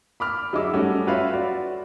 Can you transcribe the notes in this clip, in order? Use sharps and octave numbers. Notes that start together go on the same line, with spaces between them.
B5 D6 F6
F#3 D#4 G#4 E5 D6 E6
G3 A3 C#4 F#4
F4 F#4 B4 C#5 E5 F5
F#4 D5